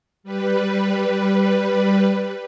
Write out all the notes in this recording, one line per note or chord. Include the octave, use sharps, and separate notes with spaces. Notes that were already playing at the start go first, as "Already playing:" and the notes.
G3 B4